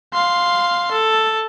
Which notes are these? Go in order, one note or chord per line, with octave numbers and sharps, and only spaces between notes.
F5 C6
A4